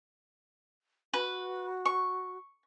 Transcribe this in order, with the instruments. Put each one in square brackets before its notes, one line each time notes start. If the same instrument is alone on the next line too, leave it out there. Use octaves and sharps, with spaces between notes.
[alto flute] F#4 [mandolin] B4
[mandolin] C#6